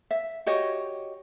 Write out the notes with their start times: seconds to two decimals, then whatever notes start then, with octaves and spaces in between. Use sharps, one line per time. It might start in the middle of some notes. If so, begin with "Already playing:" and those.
0.11 E5
0.46 F#4 G4 C#5 D#5